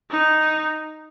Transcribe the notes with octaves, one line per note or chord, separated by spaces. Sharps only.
D#4